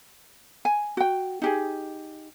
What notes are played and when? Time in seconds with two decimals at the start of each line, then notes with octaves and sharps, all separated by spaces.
0.65 G#5
0.97 F#4 G5
1.42 D#4 G4 G#4